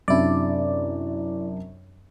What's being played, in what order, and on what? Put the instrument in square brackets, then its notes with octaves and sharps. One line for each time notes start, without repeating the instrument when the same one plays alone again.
[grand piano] F#2 C3 D4 [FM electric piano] E4 D5